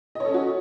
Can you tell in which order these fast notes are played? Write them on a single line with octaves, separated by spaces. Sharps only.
D#5 C#5 A4 C#4 F#4